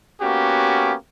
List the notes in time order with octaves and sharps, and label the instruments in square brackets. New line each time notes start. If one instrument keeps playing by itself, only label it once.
[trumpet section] A#3 B3 C#4 F#4 G4